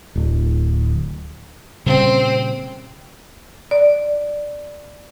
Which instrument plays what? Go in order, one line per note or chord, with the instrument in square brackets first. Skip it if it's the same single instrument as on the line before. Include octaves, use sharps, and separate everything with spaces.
[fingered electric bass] D1
[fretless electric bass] A#2 C#3 G3 [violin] C4
[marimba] D5